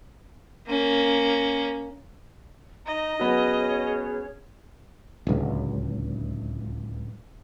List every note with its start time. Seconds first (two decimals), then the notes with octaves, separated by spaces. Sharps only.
0.67 A#3 C#4
2.86 D#4 D#5 A#5
3.20 F#3 B3 C#4 G#4 C#5
5.27 D1 C#2